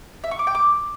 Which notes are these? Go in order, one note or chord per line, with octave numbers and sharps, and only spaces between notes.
E5
C#6
D6
G5
D6